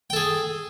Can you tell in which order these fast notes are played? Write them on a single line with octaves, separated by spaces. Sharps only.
G5 A4 G#4